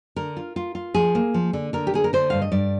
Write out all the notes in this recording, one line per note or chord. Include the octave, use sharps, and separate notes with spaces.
D3 A#4
F4
F4
F4
F3 G#4
A#3
F3
D3
D3 A#4
G4
D3 G#4
A#4
D3 C5
G2 F5
D#5
G2 D5